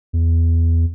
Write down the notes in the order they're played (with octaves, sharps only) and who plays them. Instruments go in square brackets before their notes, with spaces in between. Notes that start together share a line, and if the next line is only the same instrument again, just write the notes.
[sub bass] E2